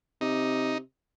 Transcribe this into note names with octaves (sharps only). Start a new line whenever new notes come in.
C3 D#4